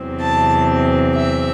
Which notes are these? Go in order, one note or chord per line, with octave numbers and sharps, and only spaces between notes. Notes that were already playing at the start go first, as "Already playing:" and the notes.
Already playing: E2 C3 F#3 C4
A5
E5